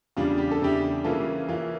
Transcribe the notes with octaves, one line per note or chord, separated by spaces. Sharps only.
E2 C#3 G3 D4 F4
G4
A4
E2 C#3 G3 D4 E4 G4
C#3 E3 A#3 C#4 F4 A4
C#3 E3 A#3 C#4 F4